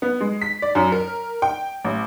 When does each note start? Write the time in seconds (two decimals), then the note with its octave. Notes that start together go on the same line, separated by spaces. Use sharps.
0.02 B3
0.21 G#3
0.41 B6
0.62 D5
0.75 F#2
0.92 A#4
1.42 G5
1.84 A1